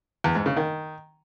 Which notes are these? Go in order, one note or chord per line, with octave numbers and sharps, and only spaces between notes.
E2
G#2
C#3
D#3